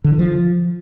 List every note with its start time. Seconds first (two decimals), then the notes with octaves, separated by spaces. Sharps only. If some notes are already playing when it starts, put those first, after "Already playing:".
0.04 D3
0.12 E3
0.19 F3